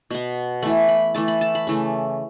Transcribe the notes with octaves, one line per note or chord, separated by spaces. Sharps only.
B2 B3
E3 A3 B5
B5
E3 A3 A5
B5
A5
B5
C#3 E3 A3